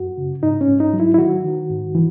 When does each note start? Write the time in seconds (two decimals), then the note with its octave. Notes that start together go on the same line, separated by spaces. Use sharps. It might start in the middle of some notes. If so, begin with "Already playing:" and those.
Already playing: F#2 F#4
0.17 C#3
0.42 G#2 D#4
0.61 C#4
0.68 G#2
0.80 D#4
0.93 F#3
1.00 E4
1.14 E4
1.18 D#3 F#4
1.44 D#3
1.69 G#2
1.95 E3